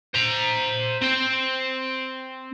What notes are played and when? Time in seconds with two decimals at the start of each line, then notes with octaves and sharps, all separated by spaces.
0.14 C5 A#5
1.02 C4 C5